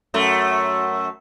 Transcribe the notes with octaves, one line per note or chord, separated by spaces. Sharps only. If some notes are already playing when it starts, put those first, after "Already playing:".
F#2 A3